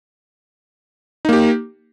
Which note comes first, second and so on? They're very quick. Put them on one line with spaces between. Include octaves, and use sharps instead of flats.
D#4 A#3 G4